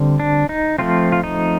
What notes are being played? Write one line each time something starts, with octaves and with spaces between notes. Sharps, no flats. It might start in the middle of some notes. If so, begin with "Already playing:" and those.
Already playing: D3 G3 C4
D4
D#4
F3 A3 C4 F4
F4
D#4